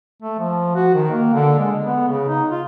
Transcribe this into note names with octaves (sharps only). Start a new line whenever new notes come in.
A3
F3
F#4
D#3
A#3
D3
G#3
B3
C#3
D#4
F4